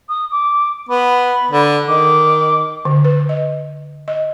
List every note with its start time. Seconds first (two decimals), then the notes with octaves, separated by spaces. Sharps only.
0.09 D#6
0.32 D6
0.89 B3 B5
1.51 D3
1.88 D#3 D6
2.85 D3
3.04 B4
3.29 D#5
4.08 D#5